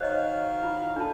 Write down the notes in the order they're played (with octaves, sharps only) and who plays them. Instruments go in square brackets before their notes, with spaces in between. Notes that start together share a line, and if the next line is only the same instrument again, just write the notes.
[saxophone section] D#3 F#4 F5 [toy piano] C5 C#5 D#5
[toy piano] E4 F4
[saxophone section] A#2 A4 [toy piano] D4 F4 A5